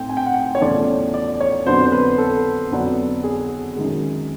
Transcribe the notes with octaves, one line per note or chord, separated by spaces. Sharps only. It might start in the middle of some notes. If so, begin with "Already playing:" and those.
Already playing: A2 A3 C4 G5
G#5
G5
F#5
G5
C#5
E2 C#3 F3 A3 C#4 D5
D5
C#5
F2 D3 F#3 B3 D4 C5
C5
B4
A4
F2 D3 F#3 B3 D4
G#4
F#2 D#3 G#3